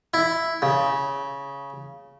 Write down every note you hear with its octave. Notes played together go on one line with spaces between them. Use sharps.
E4
C#3